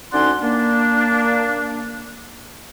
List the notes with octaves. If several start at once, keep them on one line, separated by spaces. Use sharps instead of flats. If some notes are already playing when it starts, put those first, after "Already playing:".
D2 C#4 D#4 D5 F#5 C6
A#3 D4